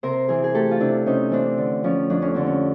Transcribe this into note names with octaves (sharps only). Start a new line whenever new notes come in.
C3 A#4 C5
E3 G#4 A#4
G#4
A3 G4 A4
F4
C3 D4 E4
C3 C#4 D#4
E3 C4 D4
D3
F3 C#4
F2 D4
C#4
D3 C4
C#4